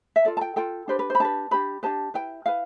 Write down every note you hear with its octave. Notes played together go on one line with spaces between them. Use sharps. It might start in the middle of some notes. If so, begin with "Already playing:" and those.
E5
F4 A4 D5
A5
G5
F4 A4 G5
D4 G4 B4 C5
B4
C5 B5
D4 G4 B4 A5
D4 G4 B4 B5
D4 G4 B4 A5
E4 B4 G5
E4 B4 F5